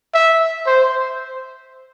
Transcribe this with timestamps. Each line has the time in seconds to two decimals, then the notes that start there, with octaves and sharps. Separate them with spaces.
0.14 E5
0.67 C5